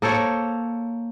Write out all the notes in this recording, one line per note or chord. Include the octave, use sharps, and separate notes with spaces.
A#3 A4 C5 C#5